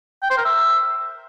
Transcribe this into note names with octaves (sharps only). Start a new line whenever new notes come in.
G5
C5
A#4
E5